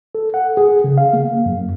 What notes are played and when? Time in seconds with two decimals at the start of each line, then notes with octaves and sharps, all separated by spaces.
0.15 A4
0.34 F#5
0.57 G#4
0.84 C#3
0.98 F5
1.13 A#3
1.46 F#2